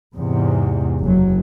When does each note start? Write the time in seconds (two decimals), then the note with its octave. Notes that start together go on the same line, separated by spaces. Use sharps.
0.14 E2 G#2 C3
1.01 F#1 F#3